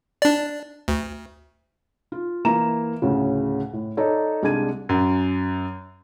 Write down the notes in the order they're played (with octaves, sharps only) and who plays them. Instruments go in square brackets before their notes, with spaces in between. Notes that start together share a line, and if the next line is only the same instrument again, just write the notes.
[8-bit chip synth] D4 D5
D2
[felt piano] F4
E3 A#3 E4 A#5 E7
D2 A2 C#3
A2
D#4 A4 C#5 D5
C2 G#3 D4 G#6 D#7
[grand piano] F#2